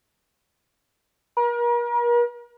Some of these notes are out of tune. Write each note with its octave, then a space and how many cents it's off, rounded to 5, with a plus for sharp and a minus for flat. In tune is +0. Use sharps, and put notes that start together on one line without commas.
A#4 +40